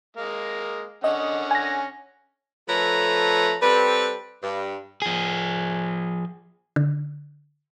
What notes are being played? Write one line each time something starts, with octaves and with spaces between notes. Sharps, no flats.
G#3 A#3
D3 C#4 D#5 F#5
G#5 A#6
F3 A3 A4 B4 C#5 A#5
G3 C4 A4 B4
G2
F3 G#4
D3